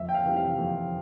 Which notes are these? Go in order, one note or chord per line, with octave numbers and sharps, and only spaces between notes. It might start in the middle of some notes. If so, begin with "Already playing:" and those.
Already playing: F2 E5
G5
F5
C3 E3 G3
F5
F2